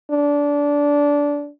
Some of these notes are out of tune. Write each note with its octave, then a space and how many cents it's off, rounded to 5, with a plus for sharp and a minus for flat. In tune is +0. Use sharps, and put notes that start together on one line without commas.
D4 -20